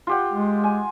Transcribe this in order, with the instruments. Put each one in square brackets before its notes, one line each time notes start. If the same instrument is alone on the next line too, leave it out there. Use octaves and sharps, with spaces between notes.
[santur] F4 G4 F#5
[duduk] G#3
[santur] G#5